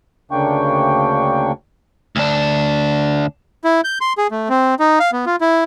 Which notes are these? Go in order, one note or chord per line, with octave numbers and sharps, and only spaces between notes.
D2 C#3 A#3 D4 G5 C#6
D2 D4
E4
G6
C6
G#4
A3
C4
D#4
F5
B3
F4
E4